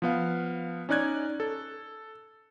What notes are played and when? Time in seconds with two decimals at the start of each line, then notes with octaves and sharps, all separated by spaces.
0.02 F3 B3 F5
0.89 C#4 D#4 D5 F#6 G#6
1.40 A4